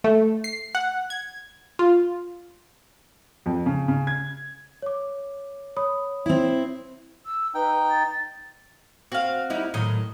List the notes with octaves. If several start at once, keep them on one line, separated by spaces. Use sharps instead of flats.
A3
C7
F#5
G#6
F4
F2
C#3
C#3
G#6
C#5 D6
C#5 B5 D#6
C4 E4
E6
D#4 B4 G5
A6
C4 F#4 F5
G3 D#4 E4
A2 D#3 F#3 D#5